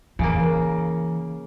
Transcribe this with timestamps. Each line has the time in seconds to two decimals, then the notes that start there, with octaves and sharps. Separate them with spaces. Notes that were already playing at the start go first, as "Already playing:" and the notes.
0.19 C#3 E3 A#3